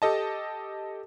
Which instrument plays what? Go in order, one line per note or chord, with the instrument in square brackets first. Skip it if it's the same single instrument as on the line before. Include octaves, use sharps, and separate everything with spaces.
[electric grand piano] G4 A4 D#5 A5